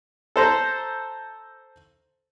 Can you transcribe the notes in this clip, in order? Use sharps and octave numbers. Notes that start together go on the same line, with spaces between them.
A4 C5 A#5